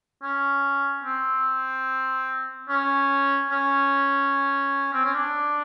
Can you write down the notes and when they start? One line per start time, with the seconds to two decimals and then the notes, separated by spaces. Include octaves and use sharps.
0.23 C#4
1.04 C4
2.69 C#4
3.50 C#4
4.93 C4
5.05 C#4
5.15 D4